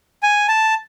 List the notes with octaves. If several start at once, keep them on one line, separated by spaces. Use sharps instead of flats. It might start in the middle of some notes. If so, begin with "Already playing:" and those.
G#5
A5